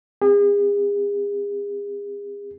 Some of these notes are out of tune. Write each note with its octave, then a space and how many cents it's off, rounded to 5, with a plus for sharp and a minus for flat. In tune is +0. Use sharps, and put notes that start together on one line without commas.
C4 +0 G#4 -40